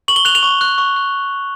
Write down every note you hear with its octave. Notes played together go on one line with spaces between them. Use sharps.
C#6 F#7
G7
F#6 F7
F7
C#6
F#6
C#6
F#6